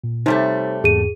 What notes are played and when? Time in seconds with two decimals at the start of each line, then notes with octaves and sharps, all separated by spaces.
0.04 A#2
0.26 C3 G3 A3 D#4 C5 C#5
0.84 E2 G#2 G#4 D#7